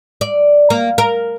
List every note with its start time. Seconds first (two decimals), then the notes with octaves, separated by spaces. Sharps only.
0.21 D5
0.70 A#3
0.98 A#4